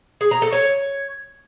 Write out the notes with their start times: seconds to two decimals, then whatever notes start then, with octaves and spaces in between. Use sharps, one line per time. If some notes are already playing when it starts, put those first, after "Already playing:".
0.21 G#4
0.31 A#5
0.42 A4
0.53 C#5